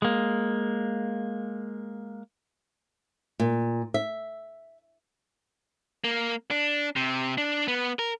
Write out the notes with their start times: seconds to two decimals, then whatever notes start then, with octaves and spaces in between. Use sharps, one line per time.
0.02 G#3 A#3
3.40 A#2
3.94 E5
6.04 A#3
6.51 D4
6.96 C3
7.38 D4
7.68 B3
7.99 A#4